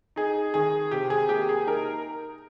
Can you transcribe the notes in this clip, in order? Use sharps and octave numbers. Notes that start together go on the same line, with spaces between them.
D#4 G#4
D#3 G#4
C3 G4
G#4
A#3 G4
G#4
D#4 A#4